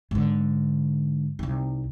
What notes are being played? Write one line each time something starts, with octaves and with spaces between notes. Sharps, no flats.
G#2 D3
C2 D#4